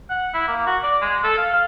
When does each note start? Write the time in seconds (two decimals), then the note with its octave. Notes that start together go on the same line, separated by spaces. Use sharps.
0.10 F#5
0.34 E4
0.48 A#3
0.67 F#4
0.83 D5
1.02 G#3
1.24 A4
1.38 F5
1.53 F5